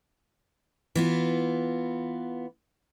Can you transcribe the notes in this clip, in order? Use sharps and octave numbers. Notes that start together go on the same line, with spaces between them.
E3 B3 F4